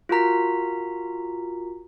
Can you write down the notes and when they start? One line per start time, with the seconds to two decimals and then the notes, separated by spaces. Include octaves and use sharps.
0.09 F4 F#4 A#4 A#5 B6